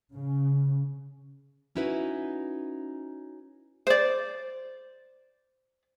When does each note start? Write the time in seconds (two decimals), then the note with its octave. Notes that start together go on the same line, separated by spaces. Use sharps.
0.14 C#3
1.76 C#4 D#4 E4 F#4 B4
3.87 C5 D5